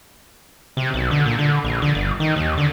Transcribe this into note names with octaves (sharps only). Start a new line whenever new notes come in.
C3
B1
D3
A#2
D3
A#1
D3
G1
D#3
D#2
D3